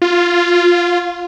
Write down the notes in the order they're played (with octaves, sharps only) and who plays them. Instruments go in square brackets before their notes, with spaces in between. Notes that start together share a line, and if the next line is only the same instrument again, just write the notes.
[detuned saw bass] F4